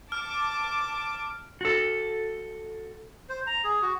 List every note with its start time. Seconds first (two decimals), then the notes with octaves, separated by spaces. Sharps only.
0.12 A5 D6 F6
1.61 F#4 A4
3.29 C5
3.47 A#5
3.64 G#4
3.82 F#4